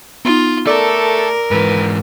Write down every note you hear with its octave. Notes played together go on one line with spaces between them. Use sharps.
B3 D#4 F4
A3 A4 A#4 D5 D6 E6
G#2 E3 B4